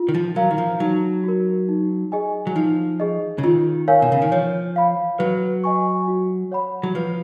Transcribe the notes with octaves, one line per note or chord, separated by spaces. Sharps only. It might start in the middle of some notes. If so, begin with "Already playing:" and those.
Already playing: F4
D#3
F3
F#3 A#4 F5 A#5
D#3
F3
F#3 D#4
F#4 A#4
D#4
G#4 D#5 G#5
F#3
F3 D#4
G#4 D#5
C#3
D#3 F4
A#4 C#5 F5 G#5
B2
C#3
D#3
F3 C#5
F5 B5
F#3 B4
D#5 G#5 C#6
F#4
C#5 F#5 B5
F#3
F3 B4